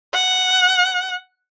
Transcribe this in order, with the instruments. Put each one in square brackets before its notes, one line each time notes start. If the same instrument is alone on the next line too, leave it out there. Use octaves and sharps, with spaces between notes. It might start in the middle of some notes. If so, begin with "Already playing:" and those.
[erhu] F#5